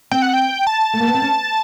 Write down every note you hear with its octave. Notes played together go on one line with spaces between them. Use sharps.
C4 G5
F#5
G5
A5
A3
A#3
B3
C4
C#4